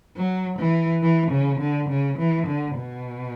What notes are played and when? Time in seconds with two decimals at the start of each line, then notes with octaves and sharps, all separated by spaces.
0.17 F#3
0.59 E3
1.03 E3
1.31 C#3
1.60 D3
1.89 C#3
2.18 E3
2.47 D3
2.76 B2